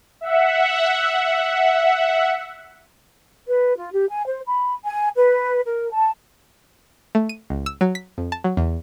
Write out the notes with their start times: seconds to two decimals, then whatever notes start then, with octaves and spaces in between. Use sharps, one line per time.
0.21 E5 F#5
3.48 B4
3.78 F4
3.93 G4
4.09 G#5
4.27 C5
4.47 B5
4.85 G#5
5.17 B4
5.66 A#4
5.93 A5
7.15 A3
7.29 D#7
7.50 C#2
7.66 E6
7.81 F#3
7.95 B6
8.18 F2
8.32 A5
8.44 F#3
8.57 E2